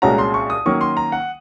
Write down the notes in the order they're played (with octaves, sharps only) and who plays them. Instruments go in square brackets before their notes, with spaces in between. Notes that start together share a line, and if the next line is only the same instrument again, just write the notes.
[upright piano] C2 A#2 G#3 C#4 F#4 [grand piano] A#5
[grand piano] C6
C#6
D#6
[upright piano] D#3 F#3 A#3 C#4 [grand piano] C#6
[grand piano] C6
A#5
F#5